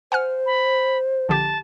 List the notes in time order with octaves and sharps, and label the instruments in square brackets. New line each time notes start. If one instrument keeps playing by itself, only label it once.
[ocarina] C5 [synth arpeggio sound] F#5 G#5 F6
[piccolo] B5
[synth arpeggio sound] A#1 D3 G4 [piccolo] A5